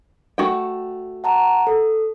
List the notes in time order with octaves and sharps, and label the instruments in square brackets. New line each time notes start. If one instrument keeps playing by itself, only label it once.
[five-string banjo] A3 F#4 G5
[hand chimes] F#5 A5 A#5
A4